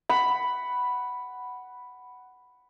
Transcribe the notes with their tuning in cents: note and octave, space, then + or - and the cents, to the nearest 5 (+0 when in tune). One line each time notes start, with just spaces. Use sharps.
F#5 +10 B5 +0